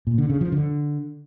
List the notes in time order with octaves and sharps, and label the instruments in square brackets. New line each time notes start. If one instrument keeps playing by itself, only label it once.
[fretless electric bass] A#2
D3
C#3
F3
D3